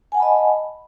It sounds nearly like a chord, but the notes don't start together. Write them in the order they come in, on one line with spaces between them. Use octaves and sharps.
G#5 F#5 A5 B5 D#5